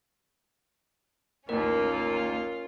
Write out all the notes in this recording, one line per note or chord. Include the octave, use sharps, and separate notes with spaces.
A1 D#2 A#3 C#4 F4 A#4